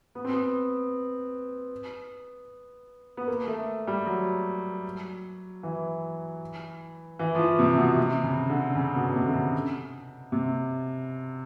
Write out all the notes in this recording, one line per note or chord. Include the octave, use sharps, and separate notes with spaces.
B3
C4
B3
B3
A#3
A3
G3
F#3
E3
E3
F3
E3
C3
B2
C3
C#3
D3
C#3
B2
C#3
C3
D3
C#3
C3